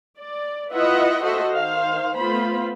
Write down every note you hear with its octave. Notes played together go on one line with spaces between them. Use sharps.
D5
E4 F4 B4 D#5 E5 F#5
F#4 A4 C5 D#5 E5 F#5
D#3 C5 F5
A3 B3 F4 C5 B5